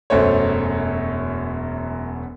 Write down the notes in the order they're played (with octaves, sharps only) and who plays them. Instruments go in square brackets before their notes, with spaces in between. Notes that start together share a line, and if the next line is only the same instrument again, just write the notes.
[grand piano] E1 F#2 A3 C5 C#5